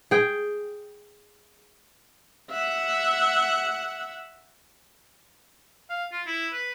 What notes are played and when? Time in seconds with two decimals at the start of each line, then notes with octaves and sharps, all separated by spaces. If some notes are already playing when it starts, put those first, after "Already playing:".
0.11 G#4 G5
2.51 E5 F#5
5.90 F5
6.12 F4
6.27 E4
6.53 B4